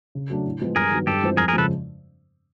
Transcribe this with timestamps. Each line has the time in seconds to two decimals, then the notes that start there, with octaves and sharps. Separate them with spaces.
0.15 C#3
0.30 F#3 A3 D4
0.46 A2
0.61 F3 G#3 B3
0.76 G2 G#4 A#4
0.91 D#3 F#3 B3
1.07 G2 G4 A4
1.22 E3 G#3 C4 F4
1.37 F2 G#4 A#4
1.48 G#4 A#4
1.53 C#3 F3 G#3 A4 B4